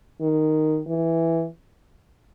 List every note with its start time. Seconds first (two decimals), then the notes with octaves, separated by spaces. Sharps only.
0.21 D#3
0.87 E3